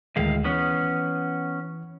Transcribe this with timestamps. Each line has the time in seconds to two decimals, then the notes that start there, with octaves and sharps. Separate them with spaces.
0.16 D2 A2 D#3 G#3 F5
0.44 E3 B3 C#4